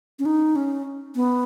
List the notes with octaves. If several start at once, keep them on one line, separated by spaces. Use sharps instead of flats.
C#4
D#4
C#4
B3